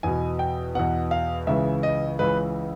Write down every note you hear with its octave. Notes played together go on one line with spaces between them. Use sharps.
E2 B2 G#5
G5
E2 B2 F#5
F5
C#2 C#3 E3 E5
D#5
C#2 C#3 E3 B4